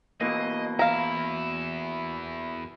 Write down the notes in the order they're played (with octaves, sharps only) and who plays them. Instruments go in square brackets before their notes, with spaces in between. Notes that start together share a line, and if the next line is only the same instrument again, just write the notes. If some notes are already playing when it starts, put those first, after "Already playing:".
[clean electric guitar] B2 E3 A#3 [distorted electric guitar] D#5
[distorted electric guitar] E2 E4 [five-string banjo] F5 A#5